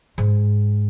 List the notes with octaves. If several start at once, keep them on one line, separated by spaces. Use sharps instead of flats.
G#2